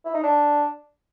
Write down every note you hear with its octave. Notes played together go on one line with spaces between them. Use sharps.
E4
D#4
D4